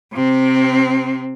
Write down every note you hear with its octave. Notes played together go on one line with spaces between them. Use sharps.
C3 C4